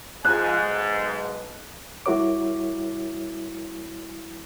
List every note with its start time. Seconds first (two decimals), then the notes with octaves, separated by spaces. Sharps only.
0.25 G#2 F3 G#5 F#6
0.59 B1
2.06 G3 E4 F#4 A#4 C#5 D6